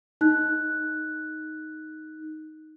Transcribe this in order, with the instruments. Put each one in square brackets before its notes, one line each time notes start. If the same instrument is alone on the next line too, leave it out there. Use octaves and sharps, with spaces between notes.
[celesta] D#4 F#6